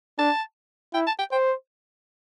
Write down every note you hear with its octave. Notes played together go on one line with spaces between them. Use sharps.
D4 A5
E4 G5
A5
G5
C5 G5